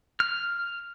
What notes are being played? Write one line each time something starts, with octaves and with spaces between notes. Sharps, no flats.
F6